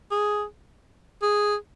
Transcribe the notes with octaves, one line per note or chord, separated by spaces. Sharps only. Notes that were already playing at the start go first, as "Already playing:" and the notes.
G#4
G#4